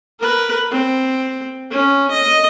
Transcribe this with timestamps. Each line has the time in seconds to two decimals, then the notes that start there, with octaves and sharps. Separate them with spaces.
0.20 A#4 B4
0.71 C4
1.71 C#4
2.11 D#5